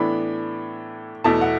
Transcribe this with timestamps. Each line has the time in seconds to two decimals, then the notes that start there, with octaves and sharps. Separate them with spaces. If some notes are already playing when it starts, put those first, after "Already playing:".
Already playing: A2 E3 B3 D4 B5
1.24 E2 B2 A3 E4 A5
1.41 F#5